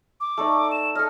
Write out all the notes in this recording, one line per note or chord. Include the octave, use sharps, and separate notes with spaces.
D6
A3 D#4 D5
E7
A4 D#5 F6